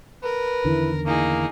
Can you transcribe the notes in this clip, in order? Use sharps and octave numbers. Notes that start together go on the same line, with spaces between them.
A#4 B4
E2 D3 D#3 E4
A#3 D#4 E4 G#4